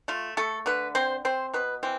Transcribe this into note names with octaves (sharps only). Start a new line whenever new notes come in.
A3 F4
A3 A4
D3 B4
C4 C5
C4 C5
B2 B4
E3 C4